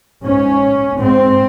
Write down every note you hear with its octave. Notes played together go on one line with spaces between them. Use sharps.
G#2 C#4
G#2 C4